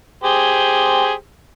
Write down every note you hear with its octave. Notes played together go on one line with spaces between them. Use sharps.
G4 G#4 C5